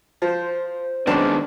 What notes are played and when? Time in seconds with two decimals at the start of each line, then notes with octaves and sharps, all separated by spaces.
0.22 F3 C5
1.07 F#2 D#3 G#3 B3 C4 D4 A5